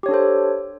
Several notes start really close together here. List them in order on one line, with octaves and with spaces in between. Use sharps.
G4 C#5 D4 A4 C5